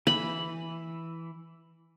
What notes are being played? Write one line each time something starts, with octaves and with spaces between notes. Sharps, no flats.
E3 B5